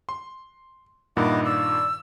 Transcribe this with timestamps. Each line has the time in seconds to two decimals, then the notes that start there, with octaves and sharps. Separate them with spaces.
0.09 C6
1.17 G2 A#2 D#3 E4 D#5 F#5 D6
1.44 D5 E6